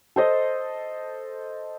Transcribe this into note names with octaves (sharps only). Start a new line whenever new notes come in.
A4 C5 D#5